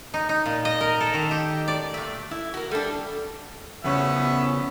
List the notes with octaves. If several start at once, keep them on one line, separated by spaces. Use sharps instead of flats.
D#4
D#4
A#2
D#5
A#4
A4
D#3
G4
D5
A#2 A3
E4
F#4 A#4
G3 D4 A4
E2 C#3 B3 C#4 E5